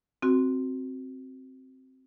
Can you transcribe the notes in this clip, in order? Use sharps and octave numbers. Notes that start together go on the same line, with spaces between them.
C4 F#4